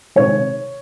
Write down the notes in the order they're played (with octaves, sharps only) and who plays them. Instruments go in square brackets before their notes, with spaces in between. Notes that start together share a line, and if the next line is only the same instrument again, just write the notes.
[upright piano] C3 D#3 G#3 C#5